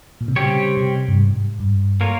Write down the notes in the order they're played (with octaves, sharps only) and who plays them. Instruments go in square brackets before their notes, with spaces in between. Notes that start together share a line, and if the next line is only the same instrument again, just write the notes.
[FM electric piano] A#2
C3
[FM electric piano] C#3 [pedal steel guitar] G3 C4 G4 C#5
[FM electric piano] C3
G2
G#2
G2
[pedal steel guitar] A#3 F4 A#4 C#5